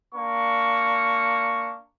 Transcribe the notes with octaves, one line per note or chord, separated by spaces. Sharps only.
A#3 D4 C#6